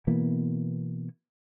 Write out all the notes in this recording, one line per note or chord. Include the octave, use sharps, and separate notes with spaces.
B2 E3 A#3 B3